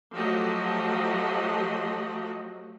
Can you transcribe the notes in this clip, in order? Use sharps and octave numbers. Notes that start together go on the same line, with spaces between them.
F3 F#3 A3 F#4 G4 D#5